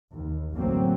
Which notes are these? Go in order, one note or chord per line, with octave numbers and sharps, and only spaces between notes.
D#2
A1 D2 F#3 A#3 C4